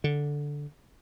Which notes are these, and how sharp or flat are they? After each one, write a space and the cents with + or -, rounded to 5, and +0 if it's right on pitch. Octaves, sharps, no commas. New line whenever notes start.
D3 -5